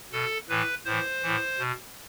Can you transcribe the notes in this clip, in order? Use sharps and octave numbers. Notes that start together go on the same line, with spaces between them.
B2 A4
A2 E3 B4
A2 E3 C5
A2 E3
B2